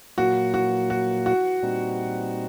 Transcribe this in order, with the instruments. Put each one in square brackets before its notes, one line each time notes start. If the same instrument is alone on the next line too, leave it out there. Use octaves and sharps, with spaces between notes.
[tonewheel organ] A#2 F#3 A#3 [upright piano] F#4
[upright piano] F#4
F#4
F#4
[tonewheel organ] A#2 G3 C4 D#4